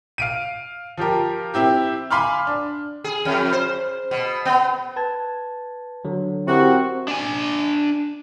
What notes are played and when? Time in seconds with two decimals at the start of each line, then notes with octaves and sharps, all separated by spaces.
0.18 F5 D7 D#7
0.98 F3 F4 G4 A#4
1.54 C4 E4 G4
2.11 F5 G#5 B5 C6 D6 F6
2.47 D4
3.04 G#4
3.25 F2
3.53 C5
4.11 B2
4.45 B3
4.96 B4 A5 G#6
6.05 D3 F#3
6.47 C4 E4 F#4 G4 A#4
7.08 D4 G#5